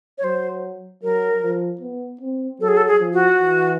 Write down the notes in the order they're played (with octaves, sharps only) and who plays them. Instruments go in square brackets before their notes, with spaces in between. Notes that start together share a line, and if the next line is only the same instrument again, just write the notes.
[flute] C#5
[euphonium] F#3 [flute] C5
[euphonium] F#3 [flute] A#4
[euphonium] F3
B3
C4
[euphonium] F#3 [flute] A4
[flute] G#4
A4
G#4
[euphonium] F3
[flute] F#4
[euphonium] E3